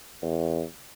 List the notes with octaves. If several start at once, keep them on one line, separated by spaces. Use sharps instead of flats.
E2